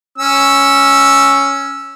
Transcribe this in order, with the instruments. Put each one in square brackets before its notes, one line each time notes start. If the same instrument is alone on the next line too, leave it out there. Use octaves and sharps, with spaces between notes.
[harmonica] C#4 E6